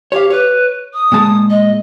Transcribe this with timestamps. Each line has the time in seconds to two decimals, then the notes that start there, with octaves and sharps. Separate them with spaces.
0.12 G4 C#5 F5
0.30 B4 C#5
0.93 D#6
1.12 A#2 G#3 A5
1.50 D#5